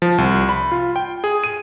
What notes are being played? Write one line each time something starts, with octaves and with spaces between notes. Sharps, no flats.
F3
C2
B5
F4
G5
G#4
D#7